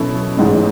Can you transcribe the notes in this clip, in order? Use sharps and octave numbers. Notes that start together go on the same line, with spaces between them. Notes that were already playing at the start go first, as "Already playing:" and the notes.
Already playing: B2 F#3 C#4 E4 A4
A1 G#2 G#3 C#4